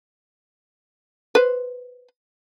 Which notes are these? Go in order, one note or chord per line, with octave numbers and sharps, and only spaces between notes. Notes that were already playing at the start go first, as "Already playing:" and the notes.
B4 C5